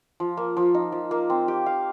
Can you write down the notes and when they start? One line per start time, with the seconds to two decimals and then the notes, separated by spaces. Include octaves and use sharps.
0.20 F3
0.37 A#3
0.57 F3
0.74 D#4
0.92 F3
1.11 A#3
1.30 C4
1.48 G4
1.66 F5